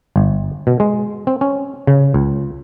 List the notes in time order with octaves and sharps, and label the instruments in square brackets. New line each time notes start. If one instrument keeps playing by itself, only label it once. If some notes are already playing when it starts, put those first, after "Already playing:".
[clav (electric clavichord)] G1
B2
G#3
C4
C#4
C#3
C#2